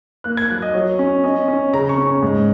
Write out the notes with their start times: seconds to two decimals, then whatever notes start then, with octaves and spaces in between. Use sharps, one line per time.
0.24 A#3 F#6
0.37 G#6
0.50 F#3 F#6
0.62 D#5
0.74 F#3 C#5
0.99 C#4
1.24 C#4 D#5
1.48 C#4
1.73 C#3 A#5
1.89 C#6
1.98 C#4
2.06 C#6
2.22 G#2